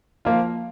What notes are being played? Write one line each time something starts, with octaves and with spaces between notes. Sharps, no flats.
F3 A#3 F4